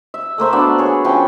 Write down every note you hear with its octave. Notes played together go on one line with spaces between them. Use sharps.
E5
A3 A#3 C5 E5
B3 D4 F#4 D5
G#4 C#5
F3 C#4 G5 C#6